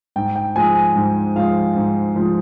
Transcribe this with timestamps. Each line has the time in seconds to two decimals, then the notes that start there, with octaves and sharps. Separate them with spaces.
0.16 G#2 G5
0.36 G5
0.56 F3 G#3 G#5
0.75 G#5
0.96 G#2
1.36 F3 G#3 F5
1.76 G#2
2.16 F3 G#3